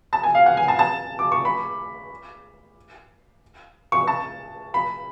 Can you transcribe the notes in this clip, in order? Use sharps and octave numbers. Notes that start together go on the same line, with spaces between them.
A5
G#5
F5
F#5
G#5
A5
A5
D6
C#6
B5
C#6
A5
B5